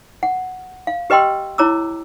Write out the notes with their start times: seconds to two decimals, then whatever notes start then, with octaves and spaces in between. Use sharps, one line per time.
0.23 F#5
0.87 F5
1.10 G4 B4 D#5 G5 C6 E6
1.58 E4 C#5 A#5 D6 E6